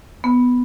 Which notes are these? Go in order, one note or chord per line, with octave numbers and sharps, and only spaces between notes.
B3